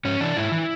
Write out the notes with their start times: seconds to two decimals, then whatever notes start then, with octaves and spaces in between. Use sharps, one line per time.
0.05 G#2 C#4
0.21 E3 D4
0.37 G#2 E4
0.52 E3